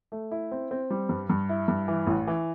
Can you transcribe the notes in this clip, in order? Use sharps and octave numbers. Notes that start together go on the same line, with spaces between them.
A3
E4
C4
C4
G3
G2
G2
E4
G2
E3
A1
E3